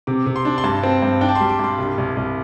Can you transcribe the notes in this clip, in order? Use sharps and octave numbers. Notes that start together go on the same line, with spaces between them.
C3 D6
C3
C6
D4
C6
G2 A5
C4
G2
D4 G5
A5
C6
G3
D6
G2 C6
C2
C2
C2